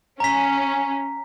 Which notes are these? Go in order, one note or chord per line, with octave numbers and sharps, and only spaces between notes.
C#4 A#5 B6